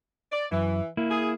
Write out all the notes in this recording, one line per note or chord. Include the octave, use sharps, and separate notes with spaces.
D5
F#2 E3
A#3 E4
G#4